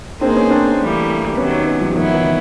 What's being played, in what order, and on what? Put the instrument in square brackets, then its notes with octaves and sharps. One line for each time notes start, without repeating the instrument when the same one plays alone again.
[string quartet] A#3 D#4 G#4 C5 [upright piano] C4 D4
[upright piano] B3 C#4
C4 D4
[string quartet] A2 E3 G3 A#3
[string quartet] C3 D#3 F#3 [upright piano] B3 C#4
[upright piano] B3 C#4
F3 G3
[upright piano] D#3 F3 [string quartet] F#3 B3 E4
[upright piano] E3
D#3